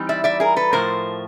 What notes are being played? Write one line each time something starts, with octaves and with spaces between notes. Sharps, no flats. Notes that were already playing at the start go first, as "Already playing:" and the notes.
Already playing: E3 G3 C4 D#4
D5 E5
D5 E5
G#4 A#4
A4 B4
A2 F3 A3 A#4 C5